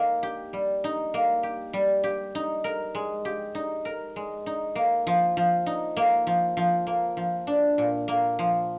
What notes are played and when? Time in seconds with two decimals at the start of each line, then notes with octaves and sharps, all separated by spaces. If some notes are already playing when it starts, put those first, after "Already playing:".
Already playing: A#3 D#4
0.23 G4
0.53 G3
0.84 D#4
1.14 A#3
1.43 G4
1.73 G3
2.04 G4
2.35 D#4
2.64 A#4
2.95 G#3
3.25 G4
3.55 D#4
3.85 A#4
4.16 G#3
4.46 D#4
4.75 A#3
5.07 F3
5.37 F3
5.66 D#4
5.97 A#3
6.27 F3
6.57 F3
6.87 A#3
7.17 F3
7.47 D4
7.78 A#2
8.08 A#3
8.39 F3